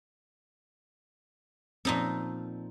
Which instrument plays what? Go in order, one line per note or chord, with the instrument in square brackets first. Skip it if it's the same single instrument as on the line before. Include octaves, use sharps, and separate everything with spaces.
[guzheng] A#2 D#4 A4 [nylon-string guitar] F3 C4